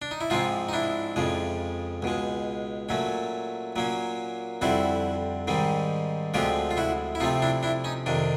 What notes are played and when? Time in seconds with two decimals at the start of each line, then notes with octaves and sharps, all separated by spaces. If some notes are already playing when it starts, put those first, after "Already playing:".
0.02 D4
0.11 D#4
0.21 E4
0.30 G#2 F3 G#3 C4 D#4 F4
0.69 D#4
0.73 D4 E4
1.16 F2 C#3 F3 G#3
2.02 C#2 B2 G#3
2.89 A#2 F#3 A3 C#4
3.76 A#2 F#3 A#3 C#4
4.61 F2 D3 G3 C4 E4 F#4
5.47 G#2 D#3 G3 C4
6.34 D2 D3 F3 G#3 C4 F4 G4
6.71 F4
6.77 E4 F#4
7.15 E4
7.20 C3 F3 A3 C4 D#4 F4
7.42 D4 E4
7.63 D4 E4
7.84 C#4 D#4
8.06 F2 C3 D#3 D4